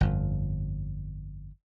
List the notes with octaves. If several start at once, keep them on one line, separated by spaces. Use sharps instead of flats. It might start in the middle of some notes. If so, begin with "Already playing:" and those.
G1 F2